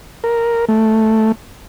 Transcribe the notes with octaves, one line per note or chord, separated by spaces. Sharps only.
A#4
A3